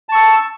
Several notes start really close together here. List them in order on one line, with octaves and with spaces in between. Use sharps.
A5 C#6 E6